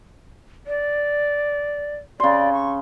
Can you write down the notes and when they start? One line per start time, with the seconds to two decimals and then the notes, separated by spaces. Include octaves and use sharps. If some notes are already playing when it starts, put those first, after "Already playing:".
0.67 D5
2.20 C#3 D5 C6
2.53 C#6